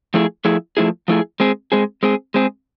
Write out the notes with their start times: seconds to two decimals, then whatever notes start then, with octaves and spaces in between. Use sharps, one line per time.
0.14 F3 A3 E4 G#4
0.45 F3 A3 E4 G#4
0.77 F3 A3 E4 G#4
1.08 F3 A3 E4 G#4
1.40 G#3 C4 G#4
1.72 G#3 C4 G#4
2.03 G#3 C4 G#4
2.34 G#3 C4 G#4